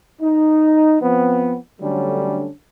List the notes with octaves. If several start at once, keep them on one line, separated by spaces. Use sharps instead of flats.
D#4
F3 B3 C4
D3 F#3 G3 A3 C#4 D4